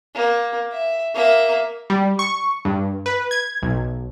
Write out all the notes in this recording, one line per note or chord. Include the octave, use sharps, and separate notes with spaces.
A#3
E5
A#3 E5
G3
C#6
G2
B4
G#6
B1